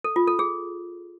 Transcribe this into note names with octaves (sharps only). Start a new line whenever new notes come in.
A4
F4
A4
G#4